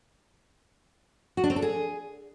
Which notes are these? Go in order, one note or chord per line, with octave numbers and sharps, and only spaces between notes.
F#4
D4
C4
A4
G#4